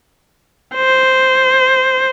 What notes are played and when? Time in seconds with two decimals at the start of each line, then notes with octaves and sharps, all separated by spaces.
0.75 C5